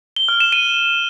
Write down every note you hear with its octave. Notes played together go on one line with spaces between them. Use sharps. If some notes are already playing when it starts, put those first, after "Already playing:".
G7
F6
E7
D#7